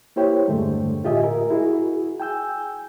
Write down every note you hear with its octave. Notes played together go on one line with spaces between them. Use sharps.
A#3 E4 G4 C5 C#5 G5
E2 G2 D3 G#3 A3
A2 F4 G4 D#5 E5 G#5
A#4
E4 F#4 G#4
G5 G#5 E6 G6